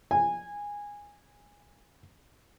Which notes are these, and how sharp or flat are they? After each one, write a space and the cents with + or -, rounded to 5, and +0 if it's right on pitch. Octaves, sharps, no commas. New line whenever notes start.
G#5 -15